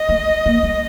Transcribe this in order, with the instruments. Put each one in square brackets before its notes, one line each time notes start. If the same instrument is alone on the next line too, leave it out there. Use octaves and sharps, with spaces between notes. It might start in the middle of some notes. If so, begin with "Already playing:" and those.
Already playing: [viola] D#5
[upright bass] A3
A#3
G3